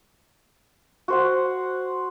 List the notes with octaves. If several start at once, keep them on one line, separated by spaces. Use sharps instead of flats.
F#4 C5 F#5